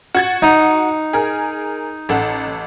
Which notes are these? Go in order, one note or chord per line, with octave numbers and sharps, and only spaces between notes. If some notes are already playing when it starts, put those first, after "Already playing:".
F#4 G#6 A6
D#4
G#4 A#4
A1 A4 F#5